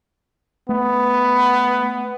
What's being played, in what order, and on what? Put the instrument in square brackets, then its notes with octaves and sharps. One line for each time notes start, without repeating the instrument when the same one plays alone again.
[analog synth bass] A3 [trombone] B3